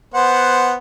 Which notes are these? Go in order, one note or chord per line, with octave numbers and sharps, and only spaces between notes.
B3 C5 F#5